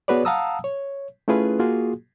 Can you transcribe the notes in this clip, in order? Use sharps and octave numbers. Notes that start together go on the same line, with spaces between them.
B3 F#4 G#4 B4 C#5 D5
F5 F#5 A5 A#5 D#6 E6
C#5
A3 C#4 E4 F4 G#4 B4
A#3 F4 F#4 G#4